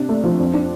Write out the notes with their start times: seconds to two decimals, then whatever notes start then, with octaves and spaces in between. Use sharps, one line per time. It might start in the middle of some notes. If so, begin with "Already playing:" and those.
Already playing: C3 D4
0.09 A3
0.24 F3
0.39 F2
0.54 D4